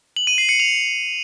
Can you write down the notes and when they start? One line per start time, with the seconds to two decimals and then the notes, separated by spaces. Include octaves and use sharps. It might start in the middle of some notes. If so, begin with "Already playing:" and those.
0.17 F#7
0.27 D#7
0.38 C7
0.49 C#7
0.60 F7